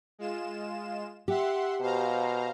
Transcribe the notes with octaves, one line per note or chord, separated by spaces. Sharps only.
G#3 F4 E7
G4 E5 F#5 C6
B2 C5 F5 A#5